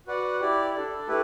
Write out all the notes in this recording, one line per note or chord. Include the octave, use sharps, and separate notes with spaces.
F#4 B4 D5 F#5
E4 G4 D5
D4 A4 D5
A3 E4 G4 B4